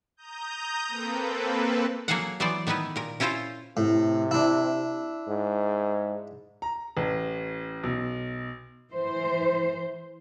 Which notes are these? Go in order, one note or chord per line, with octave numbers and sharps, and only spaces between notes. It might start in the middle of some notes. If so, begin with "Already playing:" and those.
A#5 D#6 G6
A#3 C4 A4 B4
F#3 A#3 G#4 A4 F5 F#5
E3 F#3 B3 C5 D5
D#3 B3 D#4 E4 B4
A#2 A#4
C#4 E4 F4 C5 F5 G5
A2 C3
D4 E4
G#2
A#5
A1
B1
E3 C5